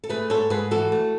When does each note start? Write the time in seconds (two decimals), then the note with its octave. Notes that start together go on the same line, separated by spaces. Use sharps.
0.04 A4
0.09 A3 G#4 B4
0.30 G#2 A4 C#5
0.50 G#2 G#4 B4
0.71 E3 F#4 A4
0.92 A3